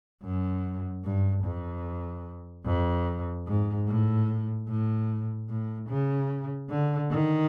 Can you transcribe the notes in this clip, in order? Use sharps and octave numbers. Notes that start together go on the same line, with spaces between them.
F#2
G2
F2
F2
G#2
A2
A2
A2
C#3
D3
D#3